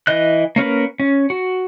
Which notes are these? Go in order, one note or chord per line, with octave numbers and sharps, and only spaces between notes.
E3 D#5 F#6
A#3 C#4 A#4 B4
C#4
F#4